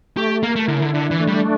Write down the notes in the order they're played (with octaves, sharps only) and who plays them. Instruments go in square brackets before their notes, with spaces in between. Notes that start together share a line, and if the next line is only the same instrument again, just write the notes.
[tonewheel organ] A3 [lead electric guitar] G4
[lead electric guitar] A#3 [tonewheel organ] A#4
[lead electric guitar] A3
[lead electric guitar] D3 [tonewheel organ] E4
[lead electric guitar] C#3
D3
[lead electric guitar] D3 [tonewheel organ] D4
[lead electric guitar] E3
[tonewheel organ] A3
[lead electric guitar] G3